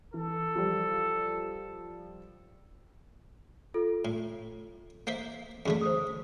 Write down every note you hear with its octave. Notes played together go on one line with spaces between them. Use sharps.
E3 A4
F3 G3
F4 A4
A2
A#3 C5 E5
F#2 D3 A3 G#4
C5 D#6